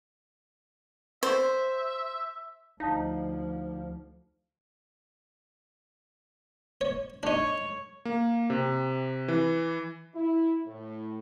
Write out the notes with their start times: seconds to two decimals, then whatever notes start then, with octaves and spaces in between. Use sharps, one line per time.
1.23 C5 E5
2.80 D2 F3 D#4 F5 A5
6.81 C#5
7.23 D4 D#4 C#5
8.05 A#3
8.50 C3
9.28 E3
10.15 E4
10.65 A2